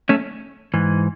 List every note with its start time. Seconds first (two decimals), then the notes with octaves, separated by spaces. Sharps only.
0.09 A3 C#4
0.74 G#2 E3